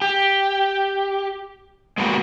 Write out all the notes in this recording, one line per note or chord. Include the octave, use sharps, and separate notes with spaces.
G4
G#3 A#3 B3 F#4 G4